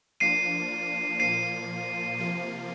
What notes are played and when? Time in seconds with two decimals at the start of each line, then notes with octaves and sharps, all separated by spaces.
0.20 F3 A#3 D4 F4 C7 D#7
1.19 A#2 F3 A#3 F4 C7 D#7
2.18 C3 F3 A#3 F4